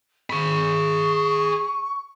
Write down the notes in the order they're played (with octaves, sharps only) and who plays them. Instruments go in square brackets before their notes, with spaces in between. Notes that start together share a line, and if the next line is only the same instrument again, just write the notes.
[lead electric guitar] G#4 B5 [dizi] C#6